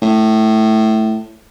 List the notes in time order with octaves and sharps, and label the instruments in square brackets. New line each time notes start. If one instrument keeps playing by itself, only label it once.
[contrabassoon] A2